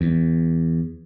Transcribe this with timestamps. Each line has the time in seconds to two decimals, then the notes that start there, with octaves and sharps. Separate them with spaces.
0.01 E2